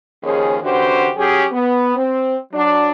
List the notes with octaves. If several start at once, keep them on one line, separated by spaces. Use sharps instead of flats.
D#2 D#3 F3 C#4 G#4
D3 E3 C#4 F#4 G4 C5
F#3 C#4 G4 G#4
B3
C4
F#3 D4